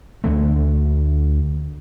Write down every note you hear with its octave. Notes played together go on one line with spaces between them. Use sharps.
D2 D3 A3